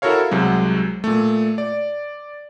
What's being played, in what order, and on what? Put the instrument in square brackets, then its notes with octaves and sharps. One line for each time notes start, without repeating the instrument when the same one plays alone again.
[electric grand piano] E4 F#4 A4 A#4 C#5 F5
C2 C3 F#3 G#3
A#2 A3
D5